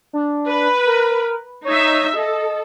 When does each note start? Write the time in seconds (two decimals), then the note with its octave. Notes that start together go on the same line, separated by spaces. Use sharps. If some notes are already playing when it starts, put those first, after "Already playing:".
0.13 D4
0.47 B4
0.86 A#4
1.65 D#4 C#5 E5
2.14 A4 D#5